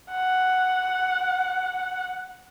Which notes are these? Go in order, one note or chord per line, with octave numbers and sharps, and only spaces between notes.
F#5